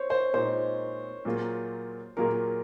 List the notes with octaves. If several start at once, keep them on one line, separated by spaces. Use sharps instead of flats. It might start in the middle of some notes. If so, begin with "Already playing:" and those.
Already playing: C5 C#5
C5
A#2 G#3 D#4 C5
A#2 F#3 A#3 F4 G#4
A#2 F#3 A#3 F4 G#4 A#4